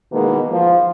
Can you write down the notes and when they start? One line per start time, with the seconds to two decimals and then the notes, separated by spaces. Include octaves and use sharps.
0.11 B2 D#3 E3 G#3 A#3 B3
0.51 F3